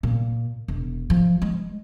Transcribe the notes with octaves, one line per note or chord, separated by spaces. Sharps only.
A#2
E1
F3
G#3